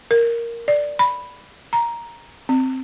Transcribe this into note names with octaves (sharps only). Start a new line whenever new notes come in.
A#4
D5
B5
A#5
C4